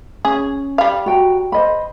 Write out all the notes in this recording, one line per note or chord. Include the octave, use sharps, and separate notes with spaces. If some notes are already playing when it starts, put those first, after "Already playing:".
C#4 G#4
G3 F5
F#4 G5 A#5
C5 D#5 B5